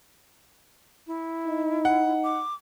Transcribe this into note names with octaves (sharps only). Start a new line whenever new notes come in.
E4
D#4
F#5
D6